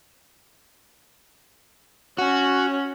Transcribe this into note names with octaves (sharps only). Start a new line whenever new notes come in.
C#4 F#4